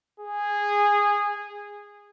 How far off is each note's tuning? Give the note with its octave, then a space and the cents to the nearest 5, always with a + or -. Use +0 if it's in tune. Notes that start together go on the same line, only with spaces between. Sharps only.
G#4 -15